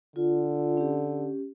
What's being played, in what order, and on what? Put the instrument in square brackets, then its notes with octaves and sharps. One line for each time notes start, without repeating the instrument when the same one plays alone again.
[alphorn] D3 [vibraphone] F4
[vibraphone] C#4 G4